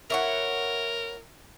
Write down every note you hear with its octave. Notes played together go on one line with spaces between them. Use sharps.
E4 A#4 C#5 F#5